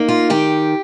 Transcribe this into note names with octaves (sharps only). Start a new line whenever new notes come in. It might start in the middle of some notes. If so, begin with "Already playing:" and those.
Already playing: A#3 D#4
F4
D#3 G4